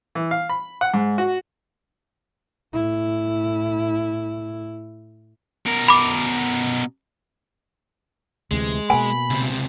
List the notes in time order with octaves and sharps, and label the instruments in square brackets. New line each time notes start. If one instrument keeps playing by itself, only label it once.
[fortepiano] E3
F5
B5
F#5
G#2
F#4
[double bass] A2 E4
[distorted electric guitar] B2 A#4
[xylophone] B5 D6
[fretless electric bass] D2 C3 E3 [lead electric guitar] G#3
[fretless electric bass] B2 A#3 [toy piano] G#5 [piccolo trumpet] B5
[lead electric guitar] C#2 C3